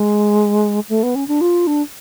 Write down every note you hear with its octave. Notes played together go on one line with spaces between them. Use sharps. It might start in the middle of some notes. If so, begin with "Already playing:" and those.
Already playing: G#3
A3
B3
C#4
D4
F4
D4